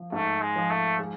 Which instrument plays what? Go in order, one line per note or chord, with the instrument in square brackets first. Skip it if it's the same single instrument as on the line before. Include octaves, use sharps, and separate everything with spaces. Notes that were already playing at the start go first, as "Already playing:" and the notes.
Already playing: [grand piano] F3
[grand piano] G#2 [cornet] A3
[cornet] G#3
[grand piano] F3
[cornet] A3
[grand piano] G#3